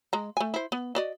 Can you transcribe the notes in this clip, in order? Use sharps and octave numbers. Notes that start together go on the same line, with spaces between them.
G#3 A#5
A3 G#5
E4 C5
B3
F#4 D5 D#5